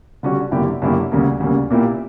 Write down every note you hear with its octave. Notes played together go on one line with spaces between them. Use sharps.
D3 G3 C#4 F#4
F#2 D3 A#3 E4 G4
F#2 D3 A#3 E4 G4
D2 C#3 G3 A#3 C#4
D2 C#3 G3 A#3 C#4
A#2 A#3 E4 G4